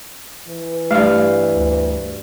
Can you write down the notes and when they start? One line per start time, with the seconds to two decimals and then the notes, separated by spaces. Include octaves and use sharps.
0.49 E3
0.91 G2 A3 F5
1.52 D2